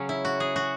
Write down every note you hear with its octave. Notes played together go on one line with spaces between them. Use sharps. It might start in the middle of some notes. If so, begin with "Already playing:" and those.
Already playing: C#3 F#3 C#4
E4
F#4
G#4
F#4